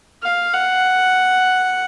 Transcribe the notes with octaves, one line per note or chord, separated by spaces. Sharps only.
F5
F#5